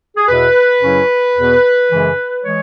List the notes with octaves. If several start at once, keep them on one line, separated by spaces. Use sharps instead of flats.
G#4
E2 B2 B3 E4 B4
F#2 C#3 F#3 C#4 E4
E2 B2 B3
F#2 C#3 E3 G#3
E3 G#3 C#5